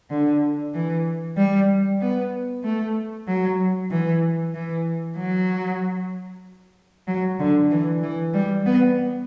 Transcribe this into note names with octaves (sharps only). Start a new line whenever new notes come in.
D3
E3
G3
B3
A3
F#3
E3
E3
F#3
F#3
D3
E3
E3
G3
B3